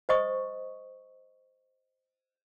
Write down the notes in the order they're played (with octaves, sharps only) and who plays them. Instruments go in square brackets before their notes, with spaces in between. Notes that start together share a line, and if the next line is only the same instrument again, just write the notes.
[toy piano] C5 D#5 C#6 D#6